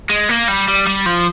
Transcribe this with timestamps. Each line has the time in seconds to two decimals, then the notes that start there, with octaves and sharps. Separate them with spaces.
0.10 G#3
0.29 A#3
0.48 G3
0.68 G3
0.87 G3
1.06 F3